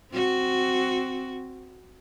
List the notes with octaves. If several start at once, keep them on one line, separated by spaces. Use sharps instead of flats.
C4 F#4